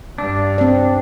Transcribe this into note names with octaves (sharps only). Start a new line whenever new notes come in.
G2 D4
C4 D5